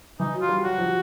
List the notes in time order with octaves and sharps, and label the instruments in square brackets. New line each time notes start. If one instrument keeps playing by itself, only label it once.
[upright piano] E3 [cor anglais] D#4
[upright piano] F#3
[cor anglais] F4
[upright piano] G3
[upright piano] F#3 [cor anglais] F#4
[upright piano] F3